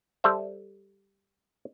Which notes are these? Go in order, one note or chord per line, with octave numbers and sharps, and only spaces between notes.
G3 A4 C5 E5